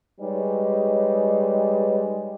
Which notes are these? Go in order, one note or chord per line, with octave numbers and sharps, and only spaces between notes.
G3 G#3 D#4 B4 C#5